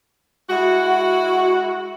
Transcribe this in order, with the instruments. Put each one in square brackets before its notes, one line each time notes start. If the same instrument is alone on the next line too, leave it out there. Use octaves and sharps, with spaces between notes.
[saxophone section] G#3 E4 F#4